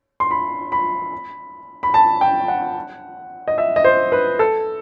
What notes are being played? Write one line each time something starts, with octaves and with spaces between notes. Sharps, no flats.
C6
B5
B5
B5
A5
G5
F#5
D#5
E5
D#5
C5
B4
A4